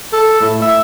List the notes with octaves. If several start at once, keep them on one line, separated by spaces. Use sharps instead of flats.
A4
A2
E5